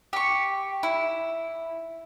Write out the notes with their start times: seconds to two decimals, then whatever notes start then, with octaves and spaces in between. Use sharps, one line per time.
0.13 G4 C#6
0.83 E4